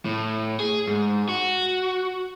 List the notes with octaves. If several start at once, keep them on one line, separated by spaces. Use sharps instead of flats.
A2
G#4
G#2
F#4